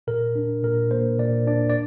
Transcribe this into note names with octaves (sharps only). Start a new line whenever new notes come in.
A#2 A#4
D4
A#2 A#4
A#3 C5
A#2 D5
D4 D5
D5